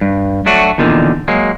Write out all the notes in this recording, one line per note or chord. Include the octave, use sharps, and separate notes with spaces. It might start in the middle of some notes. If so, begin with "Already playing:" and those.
G2
F#3 A3 D4 F#4
E2 A#2 D3 D#3
F#3 G#3 A#3